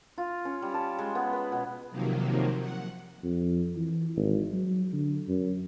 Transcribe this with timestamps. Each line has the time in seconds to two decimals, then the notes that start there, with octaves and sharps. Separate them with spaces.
0.18 F4
0.45 C#4
0.62 G3
0.74 A5
0.99 G#3
1.15 B3
1.33 B4
1.52 B2
1.91 C3 D#3 F3 F#3 A#3
2.59 F#5
3.23 F2
3.76 E3
4.17 G#1
4.53 F#3
4.93 D3
5.28 F#2